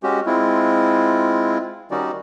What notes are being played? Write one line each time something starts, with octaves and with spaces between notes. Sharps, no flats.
G#3 C#4 F#4 G4
G#3 C4 E4 F4
D#3 G3 C#4 D#4 F#4 D5